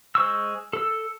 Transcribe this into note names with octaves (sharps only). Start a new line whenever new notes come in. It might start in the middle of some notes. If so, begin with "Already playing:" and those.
G#3 C5 C#6 E6
A4 E6